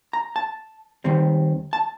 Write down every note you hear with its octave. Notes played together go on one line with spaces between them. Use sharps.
A#5
A5
D#2 D#3 G3 C4
A5